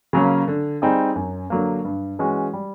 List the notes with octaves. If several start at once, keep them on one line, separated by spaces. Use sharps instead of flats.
C#3 F#3 A#3 C#4
D3
G3 C4 D#4 G#4
F#2
D3 F#3 A#3
G2
E3 G#3 C#4 F#4
G3